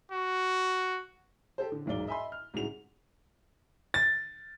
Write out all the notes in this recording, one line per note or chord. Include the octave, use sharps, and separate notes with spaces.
F#4
G4 A4 C5
D3
E1 B1 G#2 D5 G7
D#5 E5 G#5 B5 C6
F6
C2 G#2 C#3 F#4 F7
A6